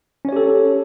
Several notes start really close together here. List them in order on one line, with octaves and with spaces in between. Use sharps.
C#4 C#5 G4 A4